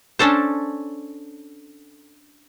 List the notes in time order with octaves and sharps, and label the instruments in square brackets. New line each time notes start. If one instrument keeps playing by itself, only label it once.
[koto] C#4 D4 A4 C5